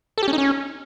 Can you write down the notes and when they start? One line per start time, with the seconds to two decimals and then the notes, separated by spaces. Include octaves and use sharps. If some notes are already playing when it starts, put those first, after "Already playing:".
0.18 A4
0.23 G4
0.28 C#4
0.33 D#4
0.38 C#4